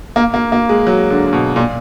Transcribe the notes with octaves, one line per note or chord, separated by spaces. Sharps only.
A#3
A#3
A#3
G#3
F#3
D3
D3
B2
A#2